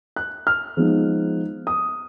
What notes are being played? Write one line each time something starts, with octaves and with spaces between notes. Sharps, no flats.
F#6
F6
F3 G#3 B3 D#4
D#6